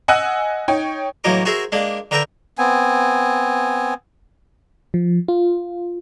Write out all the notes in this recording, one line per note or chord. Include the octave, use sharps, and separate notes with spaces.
D#5 F#5 G#5 E6 F#6 D#7
D#4 C#5 G5
A2 E3 F#3 A#3 D#5 D6
F#4 G#4 A#4 C5 E5
G#3 A#3 D4
D3 A#4 B4 E5 G5 A#5
B3 C4 G#5
F3
F4